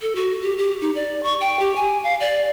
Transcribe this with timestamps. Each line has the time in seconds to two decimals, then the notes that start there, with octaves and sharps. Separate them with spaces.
0.01 A4
0.15 F#4
0.43 G4
0.58 G4
0.81 D#4
0.95 D5
1.23 C#6
1.41 G5
1.59 G4
1.76 G#5
2.04 F5
2.20 D5